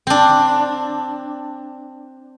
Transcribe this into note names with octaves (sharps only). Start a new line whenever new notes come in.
C4 D4